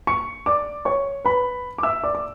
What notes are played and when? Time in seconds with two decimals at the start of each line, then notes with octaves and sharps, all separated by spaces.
0.07 C#6 C#7
0.46 D5 D6
0.85 C#5 C#6
1.25 B4 B5
1.78 D6
1.83 E5 E6
2.04 D5 D6
2.15 D6